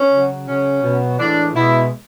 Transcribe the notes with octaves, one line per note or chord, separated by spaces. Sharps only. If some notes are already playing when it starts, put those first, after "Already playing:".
Already playing: C#4
C#3 F#3
C#3 F#3 C#4
B2 F#3
A2 E3 G#3 D4
B2 G#3 E4